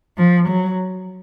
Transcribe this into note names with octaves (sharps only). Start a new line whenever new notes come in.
F3
F#3